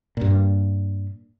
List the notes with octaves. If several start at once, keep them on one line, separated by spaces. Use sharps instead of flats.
G2 A#2